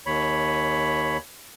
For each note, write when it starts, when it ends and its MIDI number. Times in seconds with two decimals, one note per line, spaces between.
0.06 1.17 39
0.06 1.17 73
0.06 1.17 83